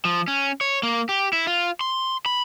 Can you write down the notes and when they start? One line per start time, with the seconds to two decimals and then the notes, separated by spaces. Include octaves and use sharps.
0.05 F3
0.28 C#4
0.61 C#5
0.83 A#3
1.09 G4
1.33 E4
1.47 F4
1.81 C6
2.26 B5